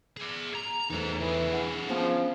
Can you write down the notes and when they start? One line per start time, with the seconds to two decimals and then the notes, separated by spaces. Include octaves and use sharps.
0.17 G#4 D5
0.55 A#5
0.90 E2 A3 D#4 C5
1.20 D3 E3 G#4
1.53 F#5
1.89 F3 B3 C#4 C5